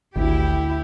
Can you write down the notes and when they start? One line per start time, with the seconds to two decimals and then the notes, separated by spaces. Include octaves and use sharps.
0.16 G#1 D2 E4 G4